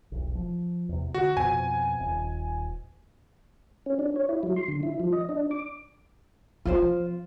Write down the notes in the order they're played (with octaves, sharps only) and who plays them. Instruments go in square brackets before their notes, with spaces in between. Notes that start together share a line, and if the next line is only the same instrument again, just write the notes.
[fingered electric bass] E1 B1
F3
E2 C3
[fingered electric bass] D3 [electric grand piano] F#4
[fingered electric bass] F2 B2 C4 [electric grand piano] G#5
[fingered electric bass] D#1
[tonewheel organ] C#4
D4
C#5
E4
F#3
C6
D3
E4
F3
D#5
D4
D6
[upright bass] F3 C4 [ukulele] F4 C5